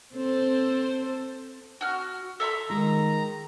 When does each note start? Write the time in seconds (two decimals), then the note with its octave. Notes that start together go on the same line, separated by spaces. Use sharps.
0.14 C4 A4 C5
1.81 F#4 F6
2.40 A4 E5 A#5 C6
2.70 D#3 G#3 F4 A#5